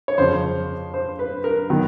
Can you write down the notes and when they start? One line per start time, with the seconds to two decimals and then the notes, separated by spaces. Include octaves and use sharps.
0.08 C#5
0.18 F2 C#3 F3 C5
0.94 C5
1.19 B4
1.44 A#4
1.70 D#3 F#3 B3